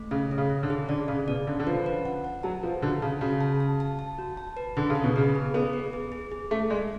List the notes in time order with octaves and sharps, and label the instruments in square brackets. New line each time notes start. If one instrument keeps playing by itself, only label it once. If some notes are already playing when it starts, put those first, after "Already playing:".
Already playing: [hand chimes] A3
[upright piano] C#3 [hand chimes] C#4
[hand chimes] C#4
[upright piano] C#3
[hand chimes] C#4
[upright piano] D3
[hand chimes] G#4
[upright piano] D3 [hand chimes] D5
[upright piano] C#3 [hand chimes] D5
[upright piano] B2 [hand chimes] D5
[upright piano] D3 [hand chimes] C#4
[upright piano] D3
[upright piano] F3 [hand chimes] B4
[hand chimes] B4
F#5
F#5
[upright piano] F#3 [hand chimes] A5
[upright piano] F3 [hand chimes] B4
[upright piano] D3 [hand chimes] F#4
[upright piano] C#3 [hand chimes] A5
[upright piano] C#3 [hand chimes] F#4
[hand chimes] A5
A5
A5
A5
F#4
A5
B4
[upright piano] D3 [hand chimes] G#4
[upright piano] C#3
[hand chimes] G#4
[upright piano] B2
[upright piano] C#3 [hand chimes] B4
[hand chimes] G#4
[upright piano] B3 [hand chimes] G#4
[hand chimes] B4
G#4
G#4
G#4
[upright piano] A3 [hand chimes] G#4
[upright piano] G#3 [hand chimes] G#4